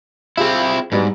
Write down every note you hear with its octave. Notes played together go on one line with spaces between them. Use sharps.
C4 E4 F4 G4 G#4
G#2 F#3 G3 B3